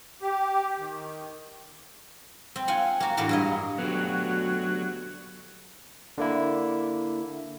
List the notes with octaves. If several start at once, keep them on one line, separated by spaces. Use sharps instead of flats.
G4
D#3
C4
F4 F#5 G#5
A#3 F#4
E2 A2 A#3 D4 F#4
G2 E4 D#5
D2 F#3 B3 F#4 G4
D3 A#3 E4